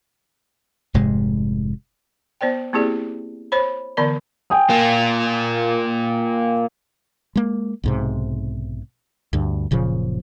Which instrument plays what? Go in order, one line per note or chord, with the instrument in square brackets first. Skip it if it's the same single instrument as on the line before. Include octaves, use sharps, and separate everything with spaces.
[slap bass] F1 G#2 C3 G#3
[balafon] B3 C5 D5 G5
A#3 C4 E4 G4 G#4 D5
C5 C#5 B5
D3 E3 B3 A#4 D5 A#5
[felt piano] G5 G#5 D#6
[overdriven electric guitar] A#3 F4
[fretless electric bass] G#3 A#3
B1 G#2 C3
D2 G2
F#1 A#2 C#3 F3